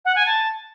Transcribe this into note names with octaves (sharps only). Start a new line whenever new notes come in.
F#5
G#5
A5